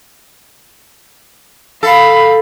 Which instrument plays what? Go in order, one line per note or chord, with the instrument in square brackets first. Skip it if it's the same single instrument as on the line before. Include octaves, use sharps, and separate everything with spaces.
[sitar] A4 [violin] F5 B5